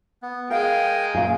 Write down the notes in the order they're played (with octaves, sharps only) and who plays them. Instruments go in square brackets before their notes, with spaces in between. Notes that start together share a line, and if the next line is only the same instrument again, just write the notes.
[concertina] B3
[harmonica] G#3 [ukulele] G#4 F5 [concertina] A#4 G5
[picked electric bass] F#2 A#2 [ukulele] F5 G#5